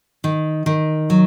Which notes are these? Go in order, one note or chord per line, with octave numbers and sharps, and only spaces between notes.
D#3
D#3
F#3